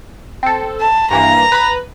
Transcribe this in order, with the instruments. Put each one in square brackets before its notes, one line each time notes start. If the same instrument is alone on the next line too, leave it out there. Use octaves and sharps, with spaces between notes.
[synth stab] C4 A4
[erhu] A5
[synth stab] G2 E3 A#3 [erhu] A#5
[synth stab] B4 B5